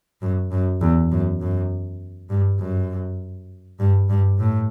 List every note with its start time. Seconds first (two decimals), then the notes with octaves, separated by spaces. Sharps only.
0.22 F#2
0.52 F#2
0.81 E2
1.12 F#2
1.41 F#2
2.30 G2
2.60 F#2
3.80 G2
4.10 G2
4.39 A2